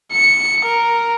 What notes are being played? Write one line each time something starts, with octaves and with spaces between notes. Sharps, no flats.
C#7
A#4